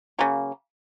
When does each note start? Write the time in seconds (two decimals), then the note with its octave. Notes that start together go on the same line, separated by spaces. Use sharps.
0.19 C#3 F#3 A#3